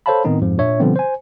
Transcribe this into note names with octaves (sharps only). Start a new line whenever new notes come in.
A4 C5 C#5 F5 A5 B5
A2 D#3 B3 C4 D#4
F2 G#2 F3
A#2 D4 C#5 E5
B2 D3 F3 G3 B3 C4
C5 G#5